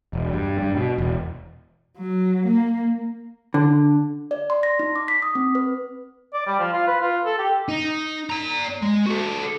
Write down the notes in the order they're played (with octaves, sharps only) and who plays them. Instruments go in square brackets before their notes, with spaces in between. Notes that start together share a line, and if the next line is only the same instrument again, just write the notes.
[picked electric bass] E1
G2
G2
B2
E1
[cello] F#3
A#3
[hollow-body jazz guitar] D3
[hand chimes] D5
C6
A#6
D#4
D6
B6
D#6
C4
B4
[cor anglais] D5
G3
F3
F4
B4
F4
A4
G4
[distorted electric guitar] D#4
D5 A#5
G#3
F#4 A4